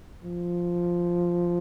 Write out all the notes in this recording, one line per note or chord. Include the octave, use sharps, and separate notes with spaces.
F3